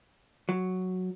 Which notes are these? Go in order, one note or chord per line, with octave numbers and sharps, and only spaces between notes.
F#3